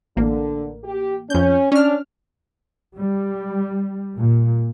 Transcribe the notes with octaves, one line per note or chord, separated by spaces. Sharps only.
A1 D3 A#3
G4
F2 C#4 G6
C#4 D4 F6
G3
A#2